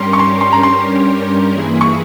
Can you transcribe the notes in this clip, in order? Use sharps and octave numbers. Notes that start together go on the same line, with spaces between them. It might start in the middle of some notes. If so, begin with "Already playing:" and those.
Already playing: G2 G3 C#4 G4 A#4 C6
C#6
C6
C6
A#5
C6
G2 E3 A#3 E4 G#4
C#6